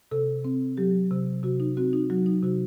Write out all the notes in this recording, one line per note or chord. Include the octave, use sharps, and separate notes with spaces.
C3 A4
C4
F#3 G4
C3
C3 F#4
D#4
C4 F#4
D#4
F#3 F#4
D#4
C3 F#4